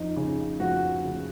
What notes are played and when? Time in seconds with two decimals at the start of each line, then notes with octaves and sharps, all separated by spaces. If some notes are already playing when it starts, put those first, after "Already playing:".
Already playing: F2 D#4
0.16 C#3
0.60 F2 F#4
1.04 C#3